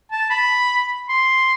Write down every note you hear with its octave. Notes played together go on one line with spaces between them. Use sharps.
A5
B5
C6